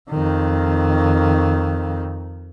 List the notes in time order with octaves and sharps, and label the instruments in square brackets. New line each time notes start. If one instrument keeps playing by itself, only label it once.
[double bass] F2 D#3